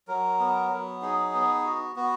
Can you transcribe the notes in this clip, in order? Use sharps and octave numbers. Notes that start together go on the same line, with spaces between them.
F#3 A#4
B3
F#3
D#4 G#4
B3
F#4
B3 F#4